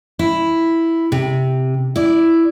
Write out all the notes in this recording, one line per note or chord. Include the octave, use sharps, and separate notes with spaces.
E4
C3
E4 D5